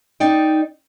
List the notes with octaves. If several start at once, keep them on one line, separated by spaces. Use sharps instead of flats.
D#4 D5 G5